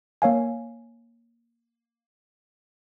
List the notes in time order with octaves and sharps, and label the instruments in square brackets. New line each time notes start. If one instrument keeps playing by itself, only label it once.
[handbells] A#3 C#5 F5 G#5